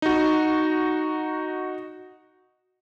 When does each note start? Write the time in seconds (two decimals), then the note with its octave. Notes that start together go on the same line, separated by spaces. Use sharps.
0.02 D#4 F#4